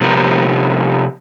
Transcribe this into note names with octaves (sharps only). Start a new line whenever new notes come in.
C3 F3 B3 G4 A#4